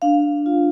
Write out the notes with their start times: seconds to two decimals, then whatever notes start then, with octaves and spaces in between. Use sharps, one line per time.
0.02 D4 F5
0.46 F4